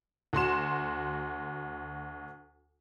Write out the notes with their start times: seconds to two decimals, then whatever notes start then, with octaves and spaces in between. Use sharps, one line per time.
0.33 D2 F#4 C6 E7